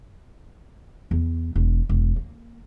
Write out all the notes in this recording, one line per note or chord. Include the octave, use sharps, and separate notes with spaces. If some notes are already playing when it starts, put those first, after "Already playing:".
E2
E1
E1
A#3